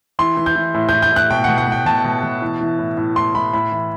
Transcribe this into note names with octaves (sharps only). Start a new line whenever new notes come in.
E3 C6
E3
G6
E3
A2
A2 G6
G6
A2 F#6
B2 G5
B2 F#5
F#5
B2 G5
B2 A5
B2
B2
E3
E3
A2
A2
A2 C6
A2 B5
A2 B5
E3